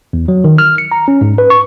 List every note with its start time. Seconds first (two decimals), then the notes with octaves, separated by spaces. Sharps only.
0.13 E2
0.28 F#3
0.44 D#3
0.58 F6
0.78 C#7
0.92 A#5
1.08 C#4
1.21 G#2
1.38 B4
1.50 C#6